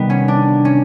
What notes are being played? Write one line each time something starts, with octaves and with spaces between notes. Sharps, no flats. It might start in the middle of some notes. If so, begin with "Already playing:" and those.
Already playing: C3 D#3 G3 B3
C#4
D4
C#4